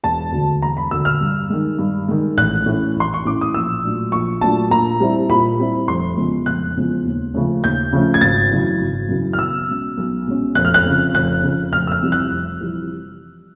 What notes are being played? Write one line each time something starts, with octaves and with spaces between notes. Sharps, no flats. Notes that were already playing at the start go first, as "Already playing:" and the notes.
E1 A5
D2 D3
E1 A#5
B5
D2 D3 E6
F6
G2
D#3 G#3
G2
D#3 G#3
A1 F#6
A2 E3 A3 C#4
A1 C6
C#6
A2 E3 A3 C#4 D6
D#6
A#1 E6
A#2 F#3 A3 D4
A#1 C#6
A#2 F#3 A3 D4 A5
A#2 A#5
G3 C4 E4
A#2 B5
G3 C4 E4
F1 C6
E2 C#3 F3 G#3
F1 F#6
E2 C#3 F3 G#3
D#2
C#3 F3 A3 C#4
D#2 G6
C#3 F3 A3 C#4
G#6
G#1 A6
F#2 C#3 E3
G#1
F#2 C#3 E3
F6
B1 E6
B2 G#3 C#4
B1
B2 G#3 C#4
F1 F#6
F6
F#6
F2 C#3
F1 F#6
F2 C#3
F1 F6
E6
F6
F2 C3 E3 G3
F#6
F1
F2 C3 E3 G3